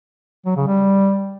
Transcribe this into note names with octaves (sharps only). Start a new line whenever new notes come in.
F#3
C#3
G3